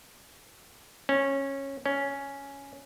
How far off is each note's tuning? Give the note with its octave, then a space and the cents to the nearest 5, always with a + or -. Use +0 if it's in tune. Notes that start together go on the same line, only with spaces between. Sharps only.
C#4 -15
C#4 +5